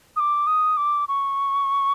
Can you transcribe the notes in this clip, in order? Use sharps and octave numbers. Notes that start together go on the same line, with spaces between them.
D#6
D6
D#6
D6
C#6